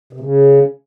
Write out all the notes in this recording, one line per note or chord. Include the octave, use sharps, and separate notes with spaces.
C3
C#3